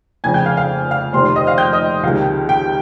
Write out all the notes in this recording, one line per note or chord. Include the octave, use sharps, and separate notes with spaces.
F1 F2 C#3 G#5 G#6
G5 G6
F5 F6
F5 F6
F5 F6
F1 F2 C3 D#3 C5 C6
C5 C6
D#5 D#6
F5 F6
G5 G6
D#5 D#6
C#2 C3 D#3 F5
G4 G5